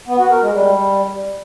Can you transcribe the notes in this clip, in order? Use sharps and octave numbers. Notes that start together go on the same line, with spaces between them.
B3
F#4
A#4
G#3
G3